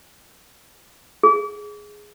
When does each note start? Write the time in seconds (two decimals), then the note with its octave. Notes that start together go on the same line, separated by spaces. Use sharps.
1.23 G#4